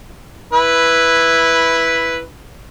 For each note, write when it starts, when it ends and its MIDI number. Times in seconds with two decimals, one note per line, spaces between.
0.53 2.20 64
0.53 2.20 71